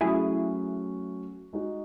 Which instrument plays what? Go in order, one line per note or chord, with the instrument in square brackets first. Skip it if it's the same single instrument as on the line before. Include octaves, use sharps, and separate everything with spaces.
[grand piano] F#3 A3 C#4 F#4 [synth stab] E4 G#4
[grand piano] G#3 D#4 F#4